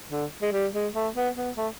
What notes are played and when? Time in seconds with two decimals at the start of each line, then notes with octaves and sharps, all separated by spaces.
0.10 D3
0.42 G#3
0.52 G3
0.73 G#3
0.93 A3
1.15 B3
1.36 B3
1.57 A3